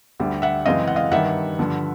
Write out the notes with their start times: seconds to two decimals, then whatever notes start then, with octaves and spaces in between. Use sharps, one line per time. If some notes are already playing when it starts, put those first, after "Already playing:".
0.20 D2 D3 G3
0.42 E5 F#5
0.66 F#2 C#3 E3 G#3 C4 D#5 F5
0.88 F#5
0.96 D#5 F5
1.12 G2 D#3 G3 E5 F#5
1.59 G2 D3 F3